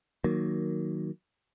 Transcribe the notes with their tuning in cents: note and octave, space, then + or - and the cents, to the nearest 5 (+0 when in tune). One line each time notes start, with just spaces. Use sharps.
D#3 +5 F#3 +0 A#3 +0